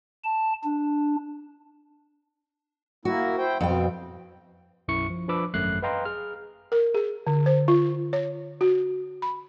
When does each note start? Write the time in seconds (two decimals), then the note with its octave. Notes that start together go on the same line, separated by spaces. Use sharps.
0.24 A5
0.64 D4
3.05 A#3 E4 F#4
3.38 E4 C5 G5
3.61 F2 B2 C4 G5
4.88 B1 F#2 E4 C#6 C#7
5.10 F3
5.28 F3 D4 B4 B5 D6 E6
5.54 G#1 F#2 A3 F#6 C7
5.83 B4 D#5 F5 G5 A#5 C6
6.05 G#4 F6
6.72 A#4
6.94 G#4
7.27 D3
7.46 C5
7.68 F4
8.13 C#5
8.61 F#4
9.22 B5